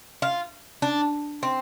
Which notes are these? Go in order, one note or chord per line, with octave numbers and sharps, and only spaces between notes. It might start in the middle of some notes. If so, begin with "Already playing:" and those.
F4
D4
C4